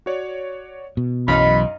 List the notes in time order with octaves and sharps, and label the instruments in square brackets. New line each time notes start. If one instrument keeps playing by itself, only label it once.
[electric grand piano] F#4 C#5 D5
[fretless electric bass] B2
[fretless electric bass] B1 E3 [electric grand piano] F#2 [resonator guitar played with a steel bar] D#4 D#5 F5 [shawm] B5